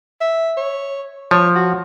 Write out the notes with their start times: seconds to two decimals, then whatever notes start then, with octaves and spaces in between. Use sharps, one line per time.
0.21 E5
0.57 C#5
1.31 F3 C#5
1.55 F#4